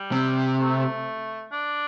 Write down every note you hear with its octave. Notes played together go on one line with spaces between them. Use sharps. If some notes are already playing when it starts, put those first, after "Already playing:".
Already playing: G3
C3
A3
D4